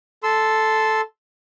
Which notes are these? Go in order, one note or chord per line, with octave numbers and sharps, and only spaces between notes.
A4 C6 E6